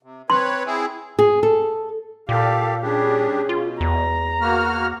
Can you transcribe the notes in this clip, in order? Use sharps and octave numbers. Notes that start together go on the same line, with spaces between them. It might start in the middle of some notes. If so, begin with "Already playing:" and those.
C3
C4 B4 C#5 C6
C4 E4 G#4
G#4
A4
A#2 G4 A4 F5
G3 C#4 D4 G4 G#4
B2 F4
E2 A#5
A#3 F#4 F6